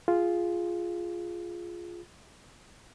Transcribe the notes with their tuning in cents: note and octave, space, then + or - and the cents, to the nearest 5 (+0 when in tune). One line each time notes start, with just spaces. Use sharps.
F4 -5 G#4 +0